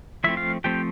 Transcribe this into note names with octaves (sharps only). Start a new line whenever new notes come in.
F3 A3 C4 E4 E5
F4 F5
F3 A3 C4 G4 G5